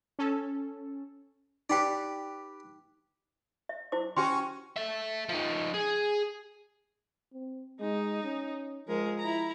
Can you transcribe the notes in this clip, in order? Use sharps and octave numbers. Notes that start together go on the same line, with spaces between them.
C#4 A4
D#4 G4 B4 D5 G5
E5
E4 C5 D6
C#4 F#4 G4 G5 C6
A4 E5
F3 D#4
G#4
C4
G#3 D#4
C#4
F3 G#3 A#4
E4 A#5